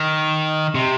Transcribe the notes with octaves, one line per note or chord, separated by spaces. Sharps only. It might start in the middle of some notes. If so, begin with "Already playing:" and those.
Already playing: D#3
C3